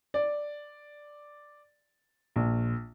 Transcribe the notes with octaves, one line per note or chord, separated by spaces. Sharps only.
D5
A#1